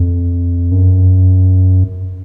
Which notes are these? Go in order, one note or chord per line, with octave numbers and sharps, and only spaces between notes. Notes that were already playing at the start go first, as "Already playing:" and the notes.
Already playing: F2
F#2